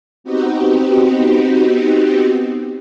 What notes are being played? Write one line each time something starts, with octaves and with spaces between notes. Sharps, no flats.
B3 C4 D#4 F#4 G4